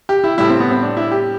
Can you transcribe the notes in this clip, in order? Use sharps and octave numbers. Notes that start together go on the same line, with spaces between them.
G4
E4
A2 G3 E4
C4
B3
C4
D4
E4
G4